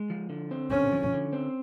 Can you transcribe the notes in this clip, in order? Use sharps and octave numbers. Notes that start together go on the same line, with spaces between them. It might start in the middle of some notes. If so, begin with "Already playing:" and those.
Already playing: G#3
F3
D3
C4
D3 C#4
F3
D3
C4